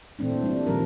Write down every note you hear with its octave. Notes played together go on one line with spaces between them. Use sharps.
A#2 E3 A3 C4 D4
G3 D4
A#2 D#3 F3 G3 A#4